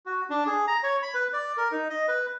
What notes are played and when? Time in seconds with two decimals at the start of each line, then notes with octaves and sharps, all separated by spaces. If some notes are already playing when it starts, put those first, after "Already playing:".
0.06 F#4
0.30 D4
0.47 G#4
0.67 A#5
0.83 C#5
1.03 B5
1.14 B4
1.33 D5
1.57 A#4
1.72 D#4
1.90 D#5
2.08 B4